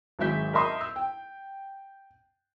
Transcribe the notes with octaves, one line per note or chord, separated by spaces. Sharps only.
G#1 F#3 G#3 E5 G6 B6
A#4 D#5 E5 C6 D#6
E6
G5